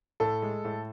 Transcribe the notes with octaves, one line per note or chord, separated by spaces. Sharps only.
A2 A4
G#3
A2